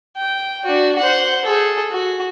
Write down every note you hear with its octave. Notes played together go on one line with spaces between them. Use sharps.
G5
D4 F#4
C5 F#5
G#4 A4
F#4